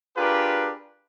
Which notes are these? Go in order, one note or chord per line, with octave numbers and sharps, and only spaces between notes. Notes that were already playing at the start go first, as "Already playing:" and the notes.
D4 F4 G4 G#4 A#4 B4